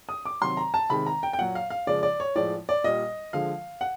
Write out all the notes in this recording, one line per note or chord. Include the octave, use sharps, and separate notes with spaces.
D#6
D6
C3 D#3 F#3 C6
A#5
A5
C3 D#3 G#3 B5
A#5
G5
G5
A#2 F#3 F#5
F5
F5
C#3 F3 G#3 D5
D5
C#5
A2 F3 G#3 D5
D5
A#2 G3 D#5
D3 F3 G#3 F5
F#5